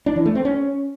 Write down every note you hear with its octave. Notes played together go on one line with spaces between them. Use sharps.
D4
E3
A3
C4
C#4